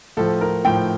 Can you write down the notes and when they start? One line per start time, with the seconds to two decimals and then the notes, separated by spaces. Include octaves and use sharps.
0.17 A2 F3 A4
0.41 A#4
0.65 A2 F3 G5